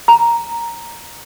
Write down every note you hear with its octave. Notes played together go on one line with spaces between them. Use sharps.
A#5